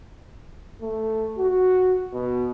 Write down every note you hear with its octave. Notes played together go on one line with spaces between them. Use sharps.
A3
F#4
B2